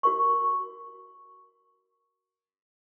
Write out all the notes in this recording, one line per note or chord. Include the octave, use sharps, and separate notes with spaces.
F#4 A#4 C#6